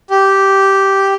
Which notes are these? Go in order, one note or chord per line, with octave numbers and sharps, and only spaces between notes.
G4